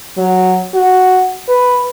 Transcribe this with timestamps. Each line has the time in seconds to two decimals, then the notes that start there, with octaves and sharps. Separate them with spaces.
0.18 F#3
0.74 F#4
1.49 B4